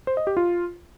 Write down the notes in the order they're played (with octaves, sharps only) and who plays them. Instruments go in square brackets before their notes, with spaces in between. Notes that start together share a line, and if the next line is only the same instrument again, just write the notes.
[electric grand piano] C5
D#5
G4
F4